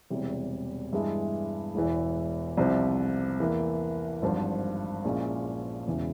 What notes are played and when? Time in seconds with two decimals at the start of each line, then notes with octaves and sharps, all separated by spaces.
0.10 E1 E2 C3 G3
0.93 G2 E3 G#3 E4
1.75 E1 E2 E3
2.58 C2 C3 F3
3.40 E2 E3 A#3
4.22 G#1 G2 F3
5.05 A#1 A#2 G#3 C#4 E4
5.87 E1 E2 C#3 E3